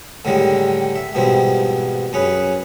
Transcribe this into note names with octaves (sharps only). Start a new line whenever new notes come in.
A2 D3 D#3 G3 G#3 D4
E5
G#2 B2 E3 F3 G3 C4
F#2 C#4 G#4 B4